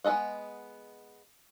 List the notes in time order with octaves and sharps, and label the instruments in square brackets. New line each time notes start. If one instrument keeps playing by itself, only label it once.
[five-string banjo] G#3 B3 A4 D#5 F#5